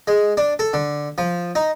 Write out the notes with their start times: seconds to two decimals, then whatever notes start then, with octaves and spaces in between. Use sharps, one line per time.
0.07 G#3
0.37 D4
0.59 A4
0.73 D3
1.18 F3
1.55 D#4